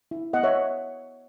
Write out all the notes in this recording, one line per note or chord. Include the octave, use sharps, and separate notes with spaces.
E4
B3 D#5 F#5
C#5 E5